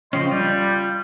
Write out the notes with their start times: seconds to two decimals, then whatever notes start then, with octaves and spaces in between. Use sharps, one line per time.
0.13 C#3 F3 C#4 D#5 G5 C6
0.31 G3 F4